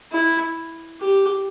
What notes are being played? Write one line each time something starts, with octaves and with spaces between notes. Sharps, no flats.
E4
G4